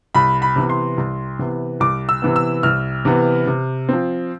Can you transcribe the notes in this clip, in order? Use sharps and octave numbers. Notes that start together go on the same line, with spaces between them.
C2 B5
B5
C3 E3 B3
C6
C2
C3 E3 B3
C2 D6
E6
C3 E3 B3
E6
C2 F6
C3 E3 B3
C3
F3 C4